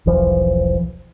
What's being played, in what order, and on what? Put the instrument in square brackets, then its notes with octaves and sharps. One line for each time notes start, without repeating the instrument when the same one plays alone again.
[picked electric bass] E1 B1 E3 F3